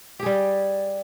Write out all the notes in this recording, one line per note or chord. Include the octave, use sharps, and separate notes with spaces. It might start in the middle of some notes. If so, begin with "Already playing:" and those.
G3 G4 G#4